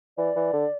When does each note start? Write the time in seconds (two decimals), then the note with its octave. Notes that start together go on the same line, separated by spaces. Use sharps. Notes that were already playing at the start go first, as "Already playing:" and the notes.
0.17 E3 D5
0.36 E3
0.53 D3